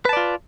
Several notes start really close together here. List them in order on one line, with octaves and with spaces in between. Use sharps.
B4 A5 D5 F4